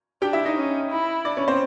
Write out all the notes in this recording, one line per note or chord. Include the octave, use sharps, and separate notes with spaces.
D4 G4 G5
E4 E5
D#4 D#5
C#4
E4
D4 D5
C#4 C#5
C4 C5